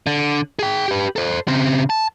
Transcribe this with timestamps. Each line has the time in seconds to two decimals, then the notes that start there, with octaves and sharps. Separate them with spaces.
0.07 D3
0.59 G#4 G5
0.88 G4 B4
1.16 A4 C5
1.48 C#3 C4
1.90 A5